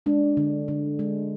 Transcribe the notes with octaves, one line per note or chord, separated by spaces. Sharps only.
G#3 D4
D3
D3
G#3